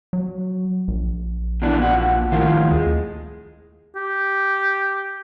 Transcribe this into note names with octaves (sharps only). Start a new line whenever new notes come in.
F#3
A#1
B2 E3 D4
A#2 F#4
A2 D#3 F3 F4
D#2 G#3
G4